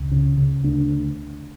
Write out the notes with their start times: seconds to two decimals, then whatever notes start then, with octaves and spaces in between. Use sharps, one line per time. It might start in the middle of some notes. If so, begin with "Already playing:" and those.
Already playing: C#2
0.12 C#3
0.37 C#3
0.64 D2 D4